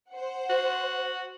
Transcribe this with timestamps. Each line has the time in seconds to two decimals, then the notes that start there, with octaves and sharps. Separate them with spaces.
0.11 C5 F#5
0.50 F#4